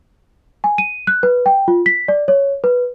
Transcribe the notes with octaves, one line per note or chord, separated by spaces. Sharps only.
G#5
D#7
F#6
B4
G5
F4
B6
D5
C#5
B4